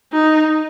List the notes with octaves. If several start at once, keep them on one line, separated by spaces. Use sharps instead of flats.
D#4